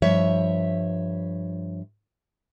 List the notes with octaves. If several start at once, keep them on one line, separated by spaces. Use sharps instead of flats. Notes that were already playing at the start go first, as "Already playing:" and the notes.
G2 F3 C#5 E5